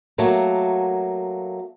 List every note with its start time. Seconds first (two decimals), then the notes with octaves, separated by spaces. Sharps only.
0.18 F#3 A3 A#3